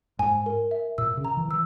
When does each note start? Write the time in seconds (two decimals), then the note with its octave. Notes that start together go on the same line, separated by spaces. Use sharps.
0.19 G#2 G#5
0.46 A#4
0.71 E5
0.98 A#2 E6
1.17 C#3
1.25 A#5
1.37 E3
1.48 E3 E6